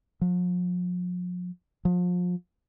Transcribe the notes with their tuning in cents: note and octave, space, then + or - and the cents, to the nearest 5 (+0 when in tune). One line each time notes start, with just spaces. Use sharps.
F3 +45
F3 +35